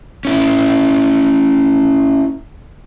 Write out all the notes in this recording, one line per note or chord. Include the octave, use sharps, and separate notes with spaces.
C#4 E4